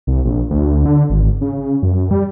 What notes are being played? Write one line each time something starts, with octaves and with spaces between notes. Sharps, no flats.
C2
A#1
D2
D3
G#1
C#3
F#2
G3